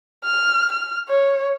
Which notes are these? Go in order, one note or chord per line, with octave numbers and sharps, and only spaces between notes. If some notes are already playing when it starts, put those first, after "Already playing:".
F6
F6
C#5